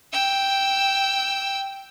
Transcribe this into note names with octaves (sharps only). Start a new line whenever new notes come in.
G5 E6